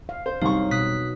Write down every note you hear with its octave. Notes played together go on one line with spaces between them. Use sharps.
F5
C5
C2 F#2 F#3 D#4 F5 C#6
B2 D#6 F#6 B6